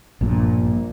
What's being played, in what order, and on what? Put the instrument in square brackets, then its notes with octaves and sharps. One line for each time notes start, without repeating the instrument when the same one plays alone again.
[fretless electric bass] A#1 G2 A#2